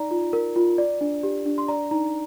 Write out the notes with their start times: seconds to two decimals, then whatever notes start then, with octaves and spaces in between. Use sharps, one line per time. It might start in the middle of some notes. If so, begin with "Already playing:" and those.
Already playing: D#4 D5 A#5
0.11 F4
0.33 A#4
0.56 F4
0.78 D5
1.01 D4
1.23 G4
1.46 D4
1.58 C6
1.68 D5 A#5
1.91 D#4 A#5